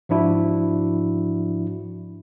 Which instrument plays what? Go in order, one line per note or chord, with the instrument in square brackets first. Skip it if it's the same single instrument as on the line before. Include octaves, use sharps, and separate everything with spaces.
[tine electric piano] G#2 F3 D4 E4 F#4